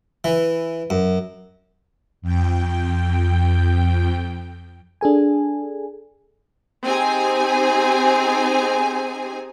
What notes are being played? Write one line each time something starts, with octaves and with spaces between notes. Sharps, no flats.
E3
F#2
F2 G5
D4 G#4 A4 G#5
C4 D#4 G4 G#4 G#5